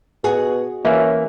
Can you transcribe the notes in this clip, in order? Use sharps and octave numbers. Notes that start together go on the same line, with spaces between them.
B2 F#4 G#4 F#5
E3 A#3 C#4 E5